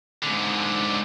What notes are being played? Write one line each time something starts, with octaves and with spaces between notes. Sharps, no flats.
G#2 D3